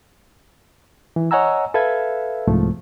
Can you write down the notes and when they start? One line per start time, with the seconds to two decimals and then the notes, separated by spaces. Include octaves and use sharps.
1.16 E3
1.31 C#5 D#5 F#5 G#5 A#5 E6
1.74 A4 B4 E5 F5 G#6
2.47 C2 G#2 F3 A3